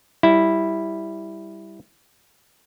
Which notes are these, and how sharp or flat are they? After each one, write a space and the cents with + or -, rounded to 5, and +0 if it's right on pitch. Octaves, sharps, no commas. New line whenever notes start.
G3 +0 E4 -5